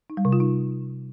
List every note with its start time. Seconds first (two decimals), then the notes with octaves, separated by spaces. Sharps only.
0.10 D#4
0.17 G3
0.25 C3
0.33 F4
0.40 D#4